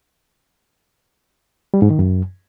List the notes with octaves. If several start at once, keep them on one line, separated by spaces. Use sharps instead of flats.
G3
G#2
D#3
F#2